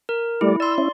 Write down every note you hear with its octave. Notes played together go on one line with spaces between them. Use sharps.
A#4
G3 A3 E4 D5
D5 C6 E6
C#4 E4